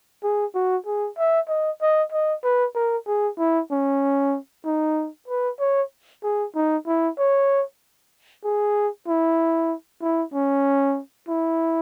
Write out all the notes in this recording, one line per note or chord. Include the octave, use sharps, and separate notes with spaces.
G#4
F#4
G#4
E5
D#5
D#5
D#5
B4
A#4
G#4
E4
C#4
D#4
B4
C#5
G#4
D#4
E4
C#5
G#4
E4
E4
C#4
E4